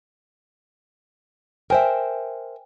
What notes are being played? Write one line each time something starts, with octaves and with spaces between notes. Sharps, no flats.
A#4 C5 E5 G5 G#5